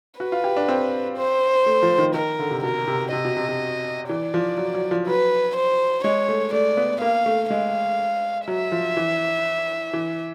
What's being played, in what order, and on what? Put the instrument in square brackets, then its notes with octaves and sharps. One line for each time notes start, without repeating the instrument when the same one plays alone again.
[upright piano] F#4 [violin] B4
[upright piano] F4
G4
D4
C4
[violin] C5
[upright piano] A3
F3
D#3
[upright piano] D#3 [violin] A#4
[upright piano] D3
C3
[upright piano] B2 [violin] A#4
[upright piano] C3
[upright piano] C3 [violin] D#5
[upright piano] B2
C3
C3
[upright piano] E3 [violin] D5
[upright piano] F3
F#3
F#3
F3
[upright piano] F#3 [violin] B4
[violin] C5
[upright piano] G#3 [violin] C#5
[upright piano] A3
[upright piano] A3 [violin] D5
[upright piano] B3
[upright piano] A#3 [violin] F5
[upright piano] A3
[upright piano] G#3 [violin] F5
[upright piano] F#3 [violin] E5
[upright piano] F3
E3
E3